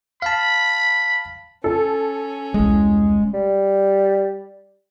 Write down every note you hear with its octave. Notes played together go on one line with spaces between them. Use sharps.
F5 A5 B5
C#4 A4
E1 C2 G#3
G3